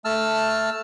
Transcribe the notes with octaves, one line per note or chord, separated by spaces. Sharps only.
A3 A5 E6 F6